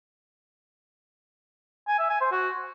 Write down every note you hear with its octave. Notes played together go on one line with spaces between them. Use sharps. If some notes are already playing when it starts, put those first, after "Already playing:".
G#5
E5
G#5
C5
F#4